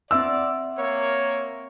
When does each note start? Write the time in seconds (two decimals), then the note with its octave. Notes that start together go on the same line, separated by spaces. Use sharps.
0.11 C4 D5 E5 C6 E6
0.78 A#3 C#5